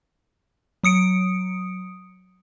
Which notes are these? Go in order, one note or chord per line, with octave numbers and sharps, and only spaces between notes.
F#3 D#6 C#7 D7